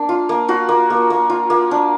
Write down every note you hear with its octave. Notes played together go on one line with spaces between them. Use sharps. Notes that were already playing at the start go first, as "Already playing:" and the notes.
Already playing: A#3 D4
F4
A#3
F4 F#4
A#3
A#3
A#3
F4
A#3
D4